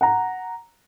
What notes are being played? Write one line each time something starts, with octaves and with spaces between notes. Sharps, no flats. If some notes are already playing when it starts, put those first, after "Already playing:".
F#5 A#5